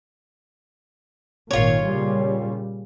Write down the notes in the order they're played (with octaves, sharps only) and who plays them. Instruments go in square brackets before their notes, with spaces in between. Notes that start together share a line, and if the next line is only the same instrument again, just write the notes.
[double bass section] G#1 A#2 D#3 [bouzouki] F4 C#5
[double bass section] A#2 C#3 G3